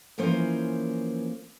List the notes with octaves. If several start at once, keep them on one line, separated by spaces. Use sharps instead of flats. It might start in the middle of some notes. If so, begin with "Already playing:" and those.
E3 F3 A#3 C#4 C5